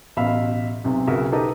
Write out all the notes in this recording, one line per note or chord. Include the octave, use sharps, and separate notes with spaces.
A1 B2 E5 F5 B5
B1 C3
B1 C#3 F#4 A#4 E5
D#4 G4 A4 B4 D#5